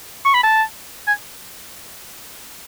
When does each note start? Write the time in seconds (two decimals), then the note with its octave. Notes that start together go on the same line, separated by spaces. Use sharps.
0.25 C#6
0.34 B5
0.43 A5
1.07 G#5